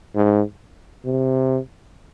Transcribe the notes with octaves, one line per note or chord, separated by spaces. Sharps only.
G#2
C3